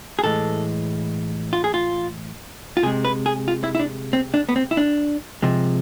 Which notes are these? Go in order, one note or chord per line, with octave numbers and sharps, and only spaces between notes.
G#4
A2 E3 G#3 A4
F4
G#4
F4
F4
C3 G#3 G#4
B4
G#4
F4
E4
E4
D4
C4
D4
B3
C4
E4
D4
C3 F3 G#3